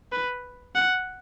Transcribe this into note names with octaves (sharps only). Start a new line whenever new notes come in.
B4
F#5